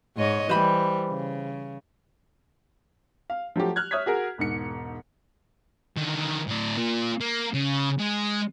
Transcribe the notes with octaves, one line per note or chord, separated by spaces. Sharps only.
G#2 C#5 D#5
E3 G3 C5 B5
C#3
F5
F3 F#3 A3 G4
F6 F#6 G#6
C#5 E5 D#6 F#6 G#6 B6
F#4 G#4 A#4
E1 G#2 C#7
D3 D#3
A2 D5
A#3 F4
A#3
C#3
G#3